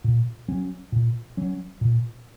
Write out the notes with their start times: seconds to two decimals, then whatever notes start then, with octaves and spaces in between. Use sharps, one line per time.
0.04 A#2
0.48 F#3 C#4
0.92 A#2
1.37 F#3 C#4
1.81 A#2